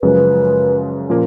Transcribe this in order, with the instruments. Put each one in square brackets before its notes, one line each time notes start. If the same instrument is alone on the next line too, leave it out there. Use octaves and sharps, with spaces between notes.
[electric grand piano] F#2 C#3 F3 G#3 [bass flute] B4
[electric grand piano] A#2 F3 A#3 [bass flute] C#4